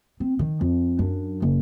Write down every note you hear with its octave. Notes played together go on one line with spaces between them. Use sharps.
C4
D#3
F2
F#2 D4
F#1